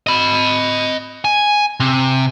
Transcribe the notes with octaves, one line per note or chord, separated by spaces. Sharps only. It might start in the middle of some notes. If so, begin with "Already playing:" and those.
D#5 B5
G#5
C3